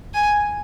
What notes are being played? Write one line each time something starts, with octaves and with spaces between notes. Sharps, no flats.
G#5